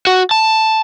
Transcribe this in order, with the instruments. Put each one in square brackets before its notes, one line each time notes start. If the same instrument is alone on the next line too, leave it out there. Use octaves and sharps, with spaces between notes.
[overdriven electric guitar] F#4
A5